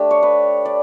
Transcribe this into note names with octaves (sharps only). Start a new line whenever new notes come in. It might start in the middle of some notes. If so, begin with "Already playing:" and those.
Already playing: A3 D4 G4
C#5
B4
D5